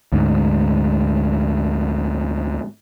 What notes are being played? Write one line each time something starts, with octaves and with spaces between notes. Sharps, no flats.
D2 G#2